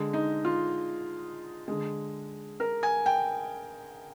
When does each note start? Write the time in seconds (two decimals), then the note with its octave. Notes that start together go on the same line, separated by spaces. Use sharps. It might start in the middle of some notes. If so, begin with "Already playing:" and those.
Already playing: D3 G#3
0.13 D#4
0.45 F4
1.68 D3 G#3
2.60 A#4
2.83 G#5
3.06 G5